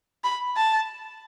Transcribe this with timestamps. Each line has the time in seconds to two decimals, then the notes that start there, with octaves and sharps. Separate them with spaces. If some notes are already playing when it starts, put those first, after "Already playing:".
0.24 B5
0.57 A5